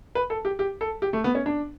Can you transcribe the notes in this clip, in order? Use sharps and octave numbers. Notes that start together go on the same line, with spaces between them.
B4
A4
G4
G4
A4
G4
A3
B3
C#4
D4